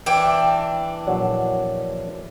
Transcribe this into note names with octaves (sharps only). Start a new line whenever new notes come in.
E3 D4 G5
A#1 F#3